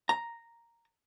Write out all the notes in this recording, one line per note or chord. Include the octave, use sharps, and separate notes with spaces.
A#5